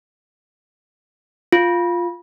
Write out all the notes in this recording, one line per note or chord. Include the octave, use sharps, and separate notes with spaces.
F4